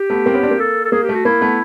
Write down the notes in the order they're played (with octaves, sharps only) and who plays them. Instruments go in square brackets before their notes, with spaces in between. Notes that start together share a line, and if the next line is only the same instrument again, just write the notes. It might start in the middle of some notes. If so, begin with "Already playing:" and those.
Already playing: [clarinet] G4
[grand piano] A3 B3
A#3 C4
B3 C#4
C4 D4
A#3
[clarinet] A4
A4
[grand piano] A#3 [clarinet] G#4
[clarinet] G4
[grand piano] A3
[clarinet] F#4
[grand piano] A#3 [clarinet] E4
[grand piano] A3 B3